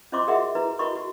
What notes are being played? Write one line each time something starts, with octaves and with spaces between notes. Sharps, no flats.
C#4 F4 C5 D#5 C6 D6
F#4 G#4 A#4 D#5 E5 F#5
E4 B4 A#5
E4 F#4 A#4 D#5 B5 C#6
F#4